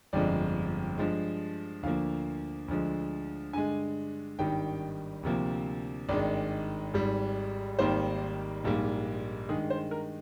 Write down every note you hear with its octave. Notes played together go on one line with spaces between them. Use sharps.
G1 F2 D3 F3 G#3 D5
G2 F3 G#3
D2 D3 F3 A#3 F5
D2 D3 F3 G#3
G2 D3 G#3 G#5
G#1 G2 D#3 G3 G5
D2 C3 F3 A#3
G#1 G2 D#3 G#3 D5
G#1 G#2 G3
G#1 G#2 D#3 G3 A#3 C5
A#1 G#2 G3 A#3
G2 D#3 G#3 G#4
C5
A#4